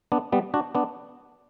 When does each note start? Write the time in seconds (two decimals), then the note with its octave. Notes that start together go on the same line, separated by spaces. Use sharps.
0.12 B3 D4
0.32 G3 B3
0.54 D4 F#4
0.75 B3 D4